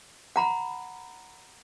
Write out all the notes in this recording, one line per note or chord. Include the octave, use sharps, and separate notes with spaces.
F#5 A#5 B5